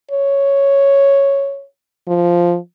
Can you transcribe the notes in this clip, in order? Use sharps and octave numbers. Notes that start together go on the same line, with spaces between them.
C#5
F3